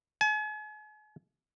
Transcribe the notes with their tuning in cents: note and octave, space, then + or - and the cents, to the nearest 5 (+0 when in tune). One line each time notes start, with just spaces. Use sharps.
G#5 +40